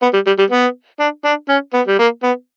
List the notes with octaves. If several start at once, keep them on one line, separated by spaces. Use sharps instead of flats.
B3
G3
G3
G3
B3
D4
D4
C#4
B3
G3
A#3
B3